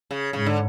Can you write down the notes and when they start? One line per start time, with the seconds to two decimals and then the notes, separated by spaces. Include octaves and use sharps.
0.11 C#3
0.33 G#2 C#3
0.46 D3